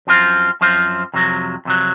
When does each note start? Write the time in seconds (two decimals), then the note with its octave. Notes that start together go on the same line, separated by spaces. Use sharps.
0.07 F#2 F3 C4 F4
0.61 F#2 F3 C4 F4
1.14 F2 C3 F#3
1.65 F2 C3 F#3